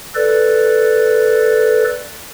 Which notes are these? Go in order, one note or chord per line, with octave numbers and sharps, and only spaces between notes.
A4 B4 D5